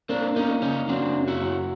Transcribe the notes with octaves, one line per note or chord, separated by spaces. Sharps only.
A#3 C4 D4
A#3 C#4 D#4
C#3 C#4 D#4
F#3 C4 D4
F#2
E4 F#4
F#3